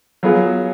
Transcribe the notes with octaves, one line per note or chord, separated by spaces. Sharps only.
F#3 B3 F4 G#4